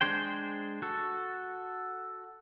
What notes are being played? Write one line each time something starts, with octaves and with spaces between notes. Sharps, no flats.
G#3 D4 G#4 C5 G5
F#4 A4